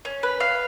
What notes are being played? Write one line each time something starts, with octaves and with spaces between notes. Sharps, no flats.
C#4
B4
F5